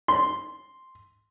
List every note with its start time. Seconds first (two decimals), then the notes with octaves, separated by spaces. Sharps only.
0.08 C6